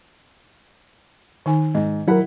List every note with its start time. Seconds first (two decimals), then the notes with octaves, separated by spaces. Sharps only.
1.46 D#3 D#4 G#5
1.75 G#2 D#5
2.07 F#3 E4 A#4 F#5 B5